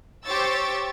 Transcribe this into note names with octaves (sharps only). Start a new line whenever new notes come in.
G4 C5 C#5 C#6 E6 A6